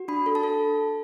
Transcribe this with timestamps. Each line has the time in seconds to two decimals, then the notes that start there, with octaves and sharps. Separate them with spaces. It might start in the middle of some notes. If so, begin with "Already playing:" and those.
Already playing: F#4
0.08 D4 B5
0.26 A4
0.35 A5
0.43 A4